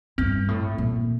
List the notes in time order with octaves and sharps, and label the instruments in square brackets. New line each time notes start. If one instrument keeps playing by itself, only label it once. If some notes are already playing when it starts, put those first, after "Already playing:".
[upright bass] G2 [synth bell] C4
[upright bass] A2
A#2